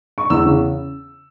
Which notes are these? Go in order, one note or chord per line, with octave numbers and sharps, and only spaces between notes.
C#6
E2 E6
C#3